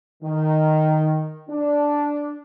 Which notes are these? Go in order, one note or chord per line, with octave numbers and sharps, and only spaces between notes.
D#3
D4